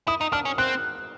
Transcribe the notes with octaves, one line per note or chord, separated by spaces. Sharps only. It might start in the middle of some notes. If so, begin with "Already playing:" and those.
E4 D#6
D#4
D4 F6
C#4
C4 F#6